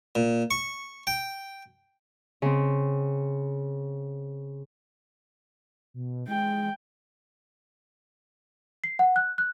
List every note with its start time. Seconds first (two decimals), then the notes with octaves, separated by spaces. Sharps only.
0.15 A#2
0.51 C#6
1.07 G5
2.42 C#3 C4
5.94 B2
6.28 G#3 G5
8.84 C7
8.99 F#5
9.16 F#6
9.38 F#6